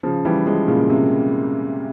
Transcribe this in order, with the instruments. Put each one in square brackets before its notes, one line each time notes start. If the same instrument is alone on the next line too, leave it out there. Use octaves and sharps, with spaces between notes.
[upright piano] C#3 F3
E3 G3
F3 G#3
A#2 C#3
C3